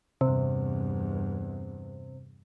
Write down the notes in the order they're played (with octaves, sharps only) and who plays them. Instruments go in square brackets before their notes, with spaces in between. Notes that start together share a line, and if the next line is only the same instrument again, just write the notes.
[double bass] E2 G2 [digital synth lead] C3